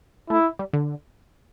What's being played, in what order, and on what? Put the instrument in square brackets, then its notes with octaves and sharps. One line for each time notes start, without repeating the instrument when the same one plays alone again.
[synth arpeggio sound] A3 [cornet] E4
[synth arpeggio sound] G3
D3